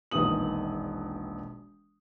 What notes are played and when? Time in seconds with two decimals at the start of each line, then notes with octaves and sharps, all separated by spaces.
0.11 E1 A#1 D#3 B3 D#6 F#7